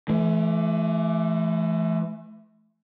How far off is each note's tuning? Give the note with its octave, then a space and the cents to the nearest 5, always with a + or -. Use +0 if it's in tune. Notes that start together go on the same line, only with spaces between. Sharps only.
E3 +25 A3 -25